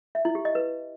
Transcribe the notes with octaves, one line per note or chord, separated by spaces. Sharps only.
E5
E4
G4
D#5
B4